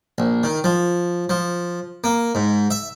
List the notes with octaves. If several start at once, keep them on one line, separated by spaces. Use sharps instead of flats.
A#1
D#3
F3
F3
A#3
G#2
E5